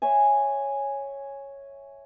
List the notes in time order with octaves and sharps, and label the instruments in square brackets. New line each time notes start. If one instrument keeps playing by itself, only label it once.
[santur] C#5 E5 G#5